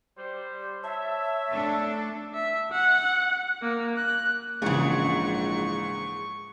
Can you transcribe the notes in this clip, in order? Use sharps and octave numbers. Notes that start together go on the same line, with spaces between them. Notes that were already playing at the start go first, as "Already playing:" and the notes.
G3 C5
C#5 E5 A5
A3 D4 A4
E5
F#5
A#3
F#6
A#1 G#2 C#3 E3 G#4 C#6